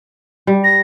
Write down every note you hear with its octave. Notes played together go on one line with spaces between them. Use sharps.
G3
A#6